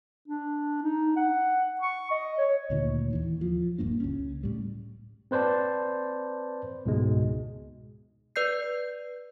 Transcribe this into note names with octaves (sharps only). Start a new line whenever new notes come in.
D4
D#4
F#5
C#6
D#5
C#5
D2 A#2 D#3
D#2 E3
F3
D#1 G2 A#3 D4
C#2 C#4
A2 G3
C4 B4 C5 D5 A5
C#2 G#2 B2 G#3
B4 D5 G6 C7